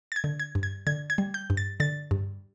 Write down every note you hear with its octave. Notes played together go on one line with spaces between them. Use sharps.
A6
G#6
D3
G#6
G2
G#6
D3 G#6
G#6
G3
G6
G2
A6
D3 A6
G2